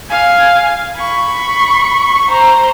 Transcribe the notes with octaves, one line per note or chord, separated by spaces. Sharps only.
F5 G#5
B5 C#6
C5 A#5